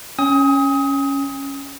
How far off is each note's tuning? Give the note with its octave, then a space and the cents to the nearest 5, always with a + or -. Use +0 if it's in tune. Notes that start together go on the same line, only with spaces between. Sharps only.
C#4 +0 G#5 -45 D#6 +25